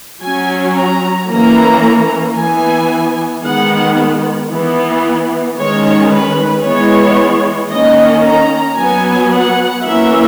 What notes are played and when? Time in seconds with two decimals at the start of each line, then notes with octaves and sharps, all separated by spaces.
0.22 F#3 C#4 G#5
0.76 A#5
1.30 E3 A#3 C#4 A#5
2.36 E3 B3 G#5
3.43 D#3 G#3 B3 F#5
4.51 E3 B3
5.57 D#3 G#3 C#4 C#5
6.10 B4
6.65 E3 G#3 B3 C#5
7.71 D#3 A#3 C#4 D#5
8.25 A#5
8.78 F#3 B3 G#5
9.32 F#5
9.85 E3 A#3 C#4 E5